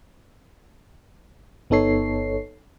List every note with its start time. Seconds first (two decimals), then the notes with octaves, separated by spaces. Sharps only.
1.70 G1 B3 D#4 A4 C#5 C7